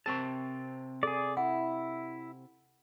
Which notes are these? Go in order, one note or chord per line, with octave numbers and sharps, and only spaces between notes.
C3 C4 A#4 A5 C#6
G#4 A4 D5
E4 F#5